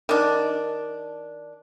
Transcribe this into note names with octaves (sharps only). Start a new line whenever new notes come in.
D#3 D4